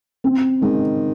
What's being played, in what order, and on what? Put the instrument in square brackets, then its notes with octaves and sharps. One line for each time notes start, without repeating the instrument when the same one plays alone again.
[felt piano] C4
[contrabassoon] D#3 [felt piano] G#3